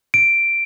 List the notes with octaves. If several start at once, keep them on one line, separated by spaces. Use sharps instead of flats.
D7